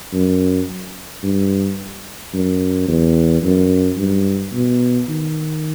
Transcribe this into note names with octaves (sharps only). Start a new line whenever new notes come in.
F#2
G2
F#2
E2
F#2
G2
B2
D#3